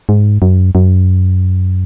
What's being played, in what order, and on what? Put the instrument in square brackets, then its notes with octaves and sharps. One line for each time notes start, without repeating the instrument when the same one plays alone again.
[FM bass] G#2
F#2
F#2